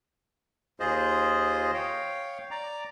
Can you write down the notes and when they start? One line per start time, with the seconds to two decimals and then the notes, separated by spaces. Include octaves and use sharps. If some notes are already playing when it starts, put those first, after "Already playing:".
0.80 D#2 F4 G#4 C5 D#5
1.74 C#5 F5 G5
2.51 D5 A#5 D6